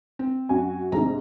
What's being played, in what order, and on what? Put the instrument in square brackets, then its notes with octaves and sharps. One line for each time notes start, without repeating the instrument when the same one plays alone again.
[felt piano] C4
[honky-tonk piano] F#2 F#4 G#5
[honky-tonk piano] A#1 G#2 C3 [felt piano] A#5